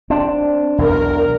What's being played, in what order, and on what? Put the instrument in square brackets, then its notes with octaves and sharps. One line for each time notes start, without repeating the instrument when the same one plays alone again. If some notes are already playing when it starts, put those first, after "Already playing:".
[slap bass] C4 [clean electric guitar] D4
[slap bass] B1 E2 [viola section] A#4